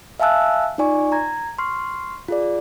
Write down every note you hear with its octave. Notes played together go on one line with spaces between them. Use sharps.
E5 F5 G#5 A5 E6 F#6
D#4 F4 D5 G#5 C#6
A#5 G#6
C6 C#6 F6 C7
F4 G#4 D5